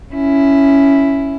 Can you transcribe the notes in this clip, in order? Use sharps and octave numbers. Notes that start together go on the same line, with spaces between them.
C#4 E4